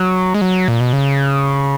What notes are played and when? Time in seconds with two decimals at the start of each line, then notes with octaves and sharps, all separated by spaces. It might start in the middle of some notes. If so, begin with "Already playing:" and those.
Already playing: F#3
0.34 G#3
0.41 F#3
0.68 A#2
0.80 B2
0.93 C#3